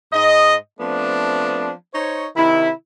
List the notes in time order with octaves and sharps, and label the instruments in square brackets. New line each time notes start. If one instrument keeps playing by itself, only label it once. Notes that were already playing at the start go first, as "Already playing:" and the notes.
[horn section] G#2 D#5
F3 A3 B3 C4 D4
D#4 C5 C#5
C3 D#3 E4